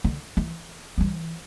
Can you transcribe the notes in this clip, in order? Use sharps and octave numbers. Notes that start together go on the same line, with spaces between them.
D3
E3
G3
E3